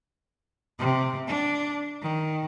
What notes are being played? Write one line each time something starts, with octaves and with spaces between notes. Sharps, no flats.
C3
D4
D#3